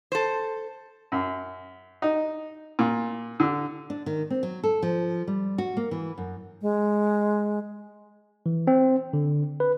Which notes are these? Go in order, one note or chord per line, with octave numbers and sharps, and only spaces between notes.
A4 C5
F#2
D#4
A#2
D3
D4
D#3
C4
F#3
A4
F3
G3
F#4
A#3
E3
F#2
G#3
E3
C4
D3
B4